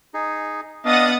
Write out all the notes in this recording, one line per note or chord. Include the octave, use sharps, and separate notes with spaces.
D#4 G#4
B3 D4 D#5 F5 F#5 D#6 A6